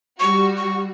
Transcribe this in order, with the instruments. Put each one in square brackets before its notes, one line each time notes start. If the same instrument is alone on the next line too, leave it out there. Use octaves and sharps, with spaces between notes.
[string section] G3 F#4 [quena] C#6
[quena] C#6